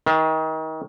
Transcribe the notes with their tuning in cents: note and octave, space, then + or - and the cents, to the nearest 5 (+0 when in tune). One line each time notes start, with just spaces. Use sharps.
D#3 +30